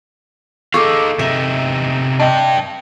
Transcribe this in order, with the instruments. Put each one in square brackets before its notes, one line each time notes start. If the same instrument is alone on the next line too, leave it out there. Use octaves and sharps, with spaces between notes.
[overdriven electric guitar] D#4 F5 [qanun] G#4 A4 [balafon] C#6 D6
[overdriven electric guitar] C3 D#4 [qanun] E5
[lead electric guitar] D4 G4 [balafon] D#5